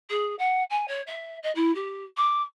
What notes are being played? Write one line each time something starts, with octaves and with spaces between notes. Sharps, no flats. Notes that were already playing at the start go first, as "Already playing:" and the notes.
G#4
F#5
G#5
C#5
E5
D#5
E4
G4
D6